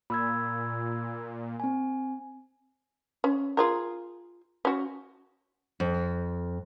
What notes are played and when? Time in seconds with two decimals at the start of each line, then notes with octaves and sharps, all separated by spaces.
0.10 A#2 B5 E6 G#6
1.60 C4 G#5
3.24 C#4
3.57 F4 G#4 A#4
4.65 C#4 F#4
5.80 F2